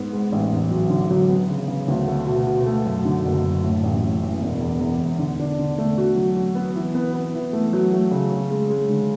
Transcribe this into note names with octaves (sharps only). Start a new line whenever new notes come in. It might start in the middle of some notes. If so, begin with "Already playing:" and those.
Already playing: G#2 B3
G#2
A1
E2
F#3
D3
F#3
B3
C#3
C#3
D2
A3
B2
B2
A3
F#2
D3
F#1
F#1
A2
A1
A2
E3
E1
E2
E2
E1
D3
D4
D3
A3
F#4
F#3
F#4
B3
E3
B3
B3
E3
A3
F#3
A3
C#3
C#4
G#3
G#3
D3